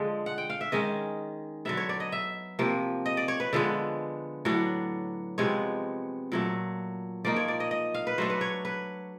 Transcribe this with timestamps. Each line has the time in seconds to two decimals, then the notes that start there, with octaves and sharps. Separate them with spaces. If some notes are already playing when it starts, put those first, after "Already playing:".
Already playing: D3 F3 G#3
0.26 F#5
0.38 G5
0.50 F5
0.61 E5
0.72 D#3 G#3 C#4 D#5
1.65 D3 F#3 B3 E5
1.77 C#5
1.89 D5
2.00 D#5
2.12 E5
2.59 C3 F3 A#3
3.06 D#5
3.17 D5
3.28 C#5
3.40 B4
3.53 D3 F3 G#3 B3
4.45 A2 F#3 B3 D4
5.38 C3 F3 G#3 B3 C#5
6.32 A#2 F#3 A3
7.25 F3 A#3 D#4 D5
7.36 C#5
7.48 D5
7.60 D#5
7.71 D#5
7.94 F5
8.07 B4
8.18 F#3 A3 D4 C5
8.30 B4
8.41 C#5
8.65 B4